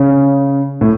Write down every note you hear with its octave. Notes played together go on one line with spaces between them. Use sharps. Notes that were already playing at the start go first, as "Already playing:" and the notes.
Already playing: C#3
A2